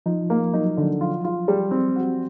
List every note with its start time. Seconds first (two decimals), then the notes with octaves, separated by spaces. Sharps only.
0.06 F3 D#4
0.30 A#3
0.54 F#3 D#4
0.77 D3
1.01 F4
1.24 F4
1.48 G3
1.71 C4
1.96 F#4